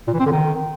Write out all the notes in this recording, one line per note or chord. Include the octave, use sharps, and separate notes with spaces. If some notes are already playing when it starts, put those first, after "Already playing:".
A#2
E3
C4
D3
D#3